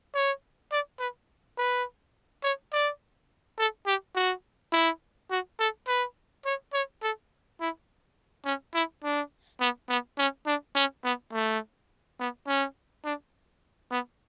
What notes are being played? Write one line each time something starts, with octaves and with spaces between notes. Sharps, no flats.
C#5
D5
B4
B4
C#5
D5
A4
G4
F#4
E4
F#4
A4
B4
C#5
C#5
A4
E4
C#4
E4
D4
B3
B3
C#4
D4
C#4
B3
A3
B3
C#4
D4
B3